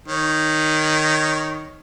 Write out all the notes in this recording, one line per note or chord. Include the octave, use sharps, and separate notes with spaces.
D#3 C#5